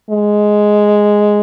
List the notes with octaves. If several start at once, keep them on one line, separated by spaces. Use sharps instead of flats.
G#3